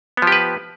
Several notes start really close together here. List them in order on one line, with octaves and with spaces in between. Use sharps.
B3 F3 G4 B4